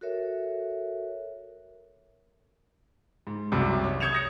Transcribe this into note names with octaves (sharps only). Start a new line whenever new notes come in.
F#4 A4 A#4 C#5 E5
G#2
F#1 C2 F#2 C3
C#5
D#6 G6 G#6 C#7 E7 F7
D#6 A#6 C#7